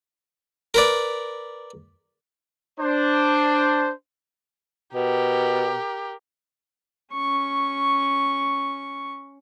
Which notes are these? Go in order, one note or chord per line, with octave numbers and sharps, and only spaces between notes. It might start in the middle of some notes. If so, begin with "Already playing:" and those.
A#4 B4 D5
D4 C5
B2 G4 A#4
C#4 C#6